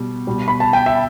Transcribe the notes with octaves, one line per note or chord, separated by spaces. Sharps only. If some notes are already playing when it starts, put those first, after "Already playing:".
Already playing: B2 G3
B2 G3
B5
A5
G5
E5